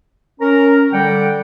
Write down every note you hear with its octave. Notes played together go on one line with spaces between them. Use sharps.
C#4 A#4 A#5
D3 G3 F#5 G5